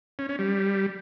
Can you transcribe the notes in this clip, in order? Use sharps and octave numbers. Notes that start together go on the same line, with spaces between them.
C#4
C#4
G3